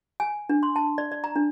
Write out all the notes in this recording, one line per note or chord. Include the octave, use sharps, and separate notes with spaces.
G#5
D4
C6
A5
D5
D5
A#5
D4